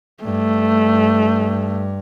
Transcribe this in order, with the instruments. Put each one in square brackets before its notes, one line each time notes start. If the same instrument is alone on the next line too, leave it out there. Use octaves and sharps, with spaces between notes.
[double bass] G2 [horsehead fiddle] A3